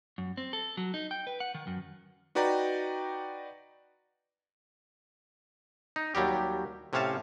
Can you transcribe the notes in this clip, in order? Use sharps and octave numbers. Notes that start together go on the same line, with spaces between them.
F#2
C4
A4
F#3
D#4
G5
B4
F#5
D#3
F#2
D#4 F#4 B4 D5 G5 A#5
D#4
D#2 F#3 G3 G4
A2 C3 C#4 C#5 F5 A5